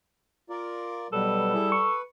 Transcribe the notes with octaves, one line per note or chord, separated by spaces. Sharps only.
F4 A#4 D5
B2 F#3 G3 A4 B4
E4 G#4 E5
B4 C#6